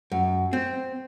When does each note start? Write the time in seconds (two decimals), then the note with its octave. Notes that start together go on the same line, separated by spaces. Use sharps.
0.12 F#2
0.53 C4